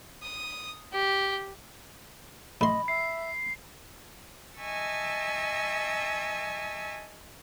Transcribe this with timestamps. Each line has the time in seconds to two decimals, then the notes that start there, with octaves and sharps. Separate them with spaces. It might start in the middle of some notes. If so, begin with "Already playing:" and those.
0.23 D#6
0.93 G4
2.61 A1 D#5 B5 C6
2.88 E5 C7
4.59 D#5 E5 G#5 A5 C#6 E6